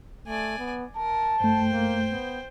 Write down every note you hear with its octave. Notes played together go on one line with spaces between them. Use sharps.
A3 D5 G#5
B3
A#4 A5
G2 A3 C5 G5
A#3
B3